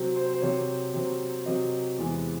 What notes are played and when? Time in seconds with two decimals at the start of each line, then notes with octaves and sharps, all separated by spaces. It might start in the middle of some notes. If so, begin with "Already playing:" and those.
Already playing: C3 F#3 C4
0.16 C5
0.33 C5
0.41 C3 F#3 C4 C#5
0.93 C3 F#3 C4
1.46 C3 F#3 C4 D#5
1.98 E2 C3 E3 G#3